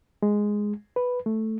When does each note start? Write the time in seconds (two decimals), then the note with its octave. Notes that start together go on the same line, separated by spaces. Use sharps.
0.23 G#3
0.96 B4
1.26 A3